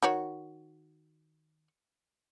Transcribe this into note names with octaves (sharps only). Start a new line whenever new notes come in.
D#3 F#4 C#5